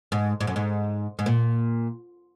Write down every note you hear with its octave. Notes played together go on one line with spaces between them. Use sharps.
G#2
G#2
F#2
G#2
G#2
A#2